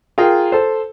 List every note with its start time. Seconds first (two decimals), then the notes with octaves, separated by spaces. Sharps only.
0.18 F4 G#4 A#4 G5
0.52 A4 C5